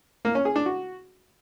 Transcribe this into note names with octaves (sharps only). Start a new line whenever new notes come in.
A#3
C#4
G#4
D4
F#4